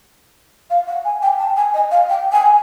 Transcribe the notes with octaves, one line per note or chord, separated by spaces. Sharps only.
F5
F#5
G#5
G5
A5
G#5
D#5
F5
G5
G#5